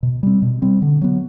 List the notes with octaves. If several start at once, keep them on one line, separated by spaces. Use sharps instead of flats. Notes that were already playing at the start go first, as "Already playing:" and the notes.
B2
G3 C4
B2
G3 C4
D3
F#3 B3